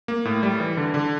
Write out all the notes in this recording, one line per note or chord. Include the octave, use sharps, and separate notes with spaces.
A#3
A2
G3
E3
D3
D3